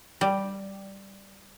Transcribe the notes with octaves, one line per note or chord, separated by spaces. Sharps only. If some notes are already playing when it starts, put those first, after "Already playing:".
G3